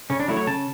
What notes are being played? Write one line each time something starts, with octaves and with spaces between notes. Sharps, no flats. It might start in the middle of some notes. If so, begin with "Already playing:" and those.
C#3 C#4
D4
F#3 A3 E4
C#5
C#3 A5